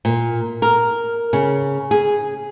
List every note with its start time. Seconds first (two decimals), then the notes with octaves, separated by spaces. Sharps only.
0.05 A#2
0.62 A#4
1.33 C#3
1.91 G#4